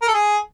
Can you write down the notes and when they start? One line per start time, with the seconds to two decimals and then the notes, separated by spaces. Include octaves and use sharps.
0.02 A#4
0.08 A4
0.14 G#4